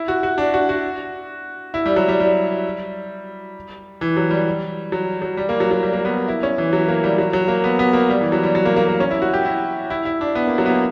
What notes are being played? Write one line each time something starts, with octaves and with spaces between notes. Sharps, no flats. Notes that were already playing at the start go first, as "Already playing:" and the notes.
Already playing: E4
F#4
F#4
D4
F#4
F#4
E4
G3
F#3
G3
G3
E3
F#3
G3
F#3
F#3
G3
A#3
F#3
F#3
G3
A#3
B3
E4
C#4
E3
F#3
A#3
G3
F#3
F#3
A#3
B3
B3
A#3
G3
E3
F#3
G3
F#3
A#3
A#3
A#3
C#4
E4
F#4
G4
E4
E4
E4
D4
B3
A#3
F#3
B3
A#3